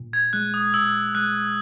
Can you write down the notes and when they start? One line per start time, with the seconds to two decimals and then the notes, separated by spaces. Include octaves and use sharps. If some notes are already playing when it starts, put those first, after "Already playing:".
Already playing: A#2
0.13 G#6
0.33 G#3 F#6
0.54 D#6
0.74 A#2 E6
1.15 G#3 F#6